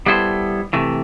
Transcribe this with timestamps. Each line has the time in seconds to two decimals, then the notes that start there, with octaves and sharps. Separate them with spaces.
0.06 G3 B3 E4 A4 C5
0.73 C3 E3 A3